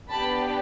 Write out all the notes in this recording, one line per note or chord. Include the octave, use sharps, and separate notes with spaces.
B3 D4 G4 A5 B5